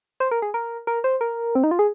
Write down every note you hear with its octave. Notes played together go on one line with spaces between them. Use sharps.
C5
A#4
G#4
A#4
A#4
C5
A#4
C4
D#4
F4
G#4